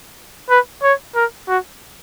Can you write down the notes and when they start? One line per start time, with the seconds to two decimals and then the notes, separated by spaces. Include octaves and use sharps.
0.50 B4
0.83 C#5
1.15 A#4
1.48 F#4